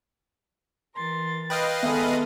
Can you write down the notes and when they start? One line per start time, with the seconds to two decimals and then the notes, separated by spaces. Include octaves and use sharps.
0.96 E3 A#4 C6 A6
1.50 B4 D#5 F5 G5
1.83 D#3 G#3 B3 A4 E5